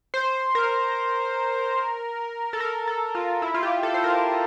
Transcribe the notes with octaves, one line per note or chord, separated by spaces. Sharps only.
C5
A#4
A4
A#4
A4
F4
E4
F4
G4
A4
C5
A#4